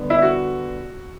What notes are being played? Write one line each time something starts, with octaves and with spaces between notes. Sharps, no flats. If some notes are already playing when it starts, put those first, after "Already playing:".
Already playing: D3 G3 B3
E4
F#4